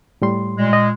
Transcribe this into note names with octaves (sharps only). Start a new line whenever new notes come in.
A2 G3 C6
A#2 G#3
D#5